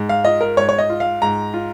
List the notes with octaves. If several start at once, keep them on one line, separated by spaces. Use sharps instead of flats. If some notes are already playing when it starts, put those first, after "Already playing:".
Already playing: G#2
F5
F4 D#5
A#4
G#2 C#5
C#5
D#5
F4
F5
G#2 A#5
F4